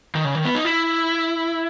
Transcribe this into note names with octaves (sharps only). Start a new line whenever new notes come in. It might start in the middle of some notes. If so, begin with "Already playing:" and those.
D#3
C#3
D#3
B3
D#4
E4